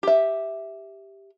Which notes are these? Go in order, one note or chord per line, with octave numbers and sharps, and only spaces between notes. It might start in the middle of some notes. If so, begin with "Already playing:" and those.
G4 E5